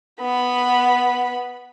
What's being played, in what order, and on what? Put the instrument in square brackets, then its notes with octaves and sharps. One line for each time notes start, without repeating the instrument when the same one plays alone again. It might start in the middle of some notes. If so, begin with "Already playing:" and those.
[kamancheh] B3 B5